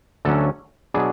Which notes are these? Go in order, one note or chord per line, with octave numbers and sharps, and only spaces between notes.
D2 D3 F#3 C#4 A4
B2 F#3 B3 D4 G#4